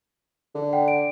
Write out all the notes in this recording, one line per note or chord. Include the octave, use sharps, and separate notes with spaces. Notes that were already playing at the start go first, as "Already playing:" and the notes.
D3
F#5 G5
D7